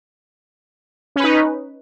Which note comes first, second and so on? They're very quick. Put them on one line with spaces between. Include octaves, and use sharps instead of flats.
C#4 B4 D#4